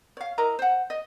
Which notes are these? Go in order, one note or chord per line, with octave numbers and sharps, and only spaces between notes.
C#5 F5
E4 A#4 D#5 A#5
C5 F#5
D#5